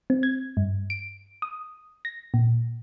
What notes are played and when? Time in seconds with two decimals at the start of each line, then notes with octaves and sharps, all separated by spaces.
0.10 C4
0.23 G#6
0.57 G2
0.90 D7
1.42 D#6
2.05 A#6
2.34 A#2